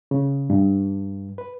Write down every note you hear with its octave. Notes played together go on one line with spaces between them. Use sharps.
C#3
G2
B4